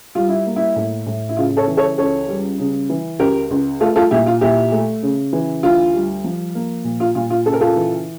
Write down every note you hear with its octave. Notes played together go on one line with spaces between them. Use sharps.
G3 F4
E4
A#3
E4
A2
A2
E4
C#3 F4
A4 C#5
E3
A4 C#5
C#2 A4 C#5
G3
C#3
E3
C#2 G4 A#4
C#2
A3 F4 A4
F4 A4
A#2 E4 G4
F4
A#2 E4 G4
A3
C#3
E3
D2 F4
G3
F3
A#3
A#2
F4
A#2 F4
F4
C#3 A4
A#4
F4 A4
E3